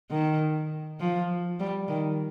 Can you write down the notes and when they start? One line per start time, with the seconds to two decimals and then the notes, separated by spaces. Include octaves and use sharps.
0.10 D#3
1.00 F3
1.60 G3
1.88 D#3